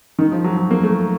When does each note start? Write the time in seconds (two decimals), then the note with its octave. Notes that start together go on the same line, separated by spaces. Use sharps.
0.19 D#3
0.32 F3
0.44 F#3
0.57 F#3
0.71 A#3
0.83 A3